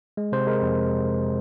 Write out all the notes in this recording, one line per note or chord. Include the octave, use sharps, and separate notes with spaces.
G#3
C3 C5
G#3 A#4
F2